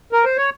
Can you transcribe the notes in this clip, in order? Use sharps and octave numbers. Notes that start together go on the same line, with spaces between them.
A#4
C5
C#5